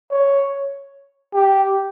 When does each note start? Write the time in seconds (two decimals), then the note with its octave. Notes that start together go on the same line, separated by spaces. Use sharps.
0.11 C#5
1.34 G4